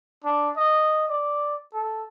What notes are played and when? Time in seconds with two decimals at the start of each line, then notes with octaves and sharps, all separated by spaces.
0.24 D4
0.57 D#5
1.09 D5
1.74 A4